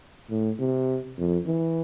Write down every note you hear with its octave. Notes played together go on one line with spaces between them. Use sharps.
A2
C3
F2
E3